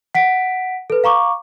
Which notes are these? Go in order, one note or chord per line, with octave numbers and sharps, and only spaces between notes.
F#5 B6 D7
A4 B4
F5 A#5 C#6 D6